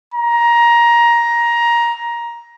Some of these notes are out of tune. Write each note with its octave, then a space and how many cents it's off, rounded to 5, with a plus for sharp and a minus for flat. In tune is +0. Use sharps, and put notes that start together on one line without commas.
A#5 +15